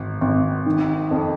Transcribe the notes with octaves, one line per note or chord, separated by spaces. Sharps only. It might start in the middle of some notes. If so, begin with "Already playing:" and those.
Already playing: G#1
G#1
D#3
F2